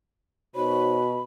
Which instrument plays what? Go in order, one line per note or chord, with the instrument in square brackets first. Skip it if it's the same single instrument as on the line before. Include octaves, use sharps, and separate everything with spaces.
[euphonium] B2 [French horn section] D#4 C5 C#5 [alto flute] F#4 [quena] B5